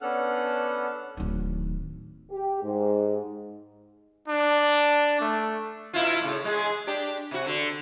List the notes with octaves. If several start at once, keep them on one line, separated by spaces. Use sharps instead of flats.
B3 C#4 D4 A4 F#5 F6
D1 D#3
G4
G#2
D4
A3
B2 E4 F4
A2 C#3
G#3 G#4
D4 G4
C3 F#4
D3